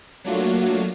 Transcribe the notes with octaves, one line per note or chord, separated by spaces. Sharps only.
F#3 A3 A#3 D4 F4 F#4